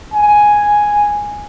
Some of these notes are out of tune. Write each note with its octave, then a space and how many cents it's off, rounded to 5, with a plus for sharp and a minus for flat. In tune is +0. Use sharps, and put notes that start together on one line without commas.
G#5 +0